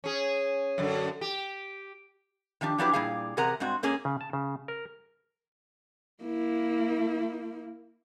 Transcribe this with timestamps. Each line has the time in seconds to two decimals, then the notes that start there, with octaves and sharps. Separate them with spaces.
0.04 C#4 G#4
0.78 F#2 D3
1.21 G4
2.61 D#3 F3 D4 G4
2.78 F3 F#3 D4 E4 G4 B4
2.93 A#2 G3 E4 G#4 F5
3.37 E2 C3 G#4 A#4 F#5 A#5
3.60 G2 G#3 C4 F#4
3.83 G#2 A#3 C#4 G#4
4.05 C#3
4.21 A5
4.33 C#3
4.68 A#4
6.23 A#3 E4